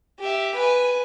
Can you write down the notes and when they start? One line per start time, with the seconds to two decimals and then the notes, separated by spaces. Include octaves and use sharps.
0.20 G4 E5
0.55 B4 G#5